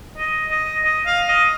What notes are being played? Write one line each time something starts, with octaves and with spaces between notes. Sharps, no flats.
D#5
D#5
D#5
F5
D#5